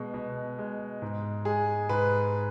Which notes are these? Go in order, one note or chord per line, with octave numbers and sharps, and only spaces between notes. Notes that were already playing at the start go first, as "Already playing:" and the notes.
Already playing: B2 G#3
B2
G#3
G#2
G#3 G#4
G#2 B4